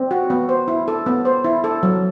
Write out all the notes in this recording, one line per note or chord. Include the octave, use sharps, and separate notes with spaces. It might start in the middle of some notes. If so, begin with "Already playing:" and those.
Already playing: C4
F#4
B3
C5
E4
A4
B3
C5
E4
A4
F#3